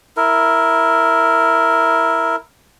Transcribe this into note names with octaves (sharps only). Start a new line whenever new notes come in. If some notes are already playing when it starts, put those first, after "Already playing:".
E4 A#4